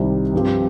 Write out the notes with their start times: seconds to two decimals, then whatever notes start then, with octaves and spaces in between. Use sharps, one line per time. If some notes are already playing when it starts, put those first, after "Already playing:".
Already playing: C2 C3 D#3 G3
0.33 G2 F3 C4 G4